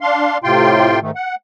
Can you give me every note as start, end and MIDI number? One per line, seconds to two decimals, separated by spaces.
0.01 0.38 62
0.01 0.38 77
0.01 0.38 84
0.44 1.00 45
0.44 1.00 48
0.44 1.00 65
0.44 1.00 79
0.44 1.00 84
1.02 1.11 44
1.02 1.11 51
1.02 1.11 57
1.16 1.35 78